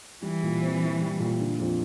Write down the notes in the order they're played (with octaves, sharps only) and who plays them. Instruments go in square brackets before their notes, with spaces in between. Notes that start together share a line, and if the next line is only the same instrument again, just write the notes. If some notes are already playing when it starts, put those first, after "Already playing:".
[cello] E3 [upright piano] G3
[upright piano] A#2
C4
E4
G3
A#2
D3
F2